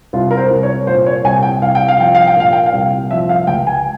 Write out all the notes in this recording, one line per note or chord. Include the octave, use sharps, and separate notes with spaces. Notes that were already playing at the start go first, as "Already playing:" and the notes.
C2 F4
A#4
C5
C2
C#5
A#2 C5
C#5
C2 G#5
G5
C2 F5
G5
F5
F3 G5
F5
G5
A#2 F5
G5
F5
C2
F3 E5
F5
C#2 G5
G#5